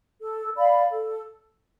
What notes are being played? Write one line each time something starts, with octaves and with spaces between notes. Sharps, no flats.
A4
D5 F5 B5
A4